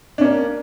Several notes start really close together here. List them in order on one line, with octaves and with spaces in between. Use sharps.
D4 C#4 A#3